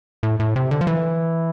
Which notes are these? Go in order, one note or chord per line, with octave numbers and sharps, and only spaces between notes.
A2
A2
C3
D3
F3
E3